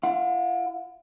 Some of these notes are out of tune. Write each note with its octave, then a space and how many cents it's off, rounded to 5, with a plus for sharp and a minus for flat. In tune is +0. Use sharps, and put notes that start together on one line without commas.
F4 -45 F#5 -40